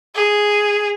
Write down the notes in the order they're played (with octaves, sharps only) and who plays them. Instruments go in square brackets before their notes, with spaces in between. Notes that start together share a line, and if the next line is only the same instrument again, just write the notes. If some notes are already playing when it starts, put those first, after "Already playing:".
[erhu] G#4